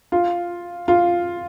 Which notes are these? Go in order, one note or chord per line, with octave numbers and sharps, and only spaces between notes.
F4
F4